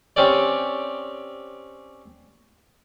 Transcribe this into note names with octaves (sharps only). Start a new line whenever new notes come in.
C4 C#4 G4 D5